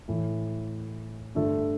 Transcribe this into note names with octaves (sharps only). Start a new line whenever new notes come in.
A2 E3 A3
G2 D3 A3